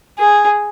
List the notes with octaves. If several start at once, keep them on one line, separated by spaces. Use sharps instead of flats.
G#4